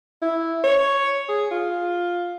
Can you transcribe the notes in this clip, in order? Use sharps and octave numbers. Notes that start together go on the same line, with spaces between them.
E4
C#5
G#4
F4